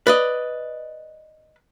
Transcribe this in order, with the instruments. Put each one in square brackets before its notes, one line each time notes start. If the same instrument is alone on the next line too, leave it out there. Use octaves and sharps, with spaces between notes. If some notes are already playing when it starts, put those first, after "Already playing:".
[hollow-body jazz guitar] B4 D5 D#5